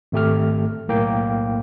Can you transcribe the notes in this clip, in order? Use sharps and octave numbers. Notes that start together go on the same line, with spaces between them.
G#1 A3 G4 F6
B1 A2 A#3 G5